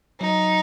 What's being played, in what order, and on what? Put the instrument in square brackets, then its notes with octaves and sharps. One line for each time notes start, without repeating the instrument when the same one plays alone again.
[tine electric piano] F#3 [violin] D#4